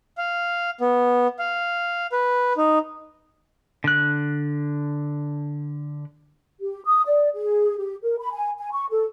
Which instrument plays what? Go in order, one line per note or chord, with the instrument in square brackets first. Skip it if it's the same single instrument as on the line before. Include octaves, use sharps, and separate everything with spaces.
[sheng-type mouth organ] F5
B3
F5
B4
D#4
[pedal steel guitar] D3 F#6
[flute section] G4
D#6
D5
G#4
G4
A#4
B5
G#5
G#5
C#6
A4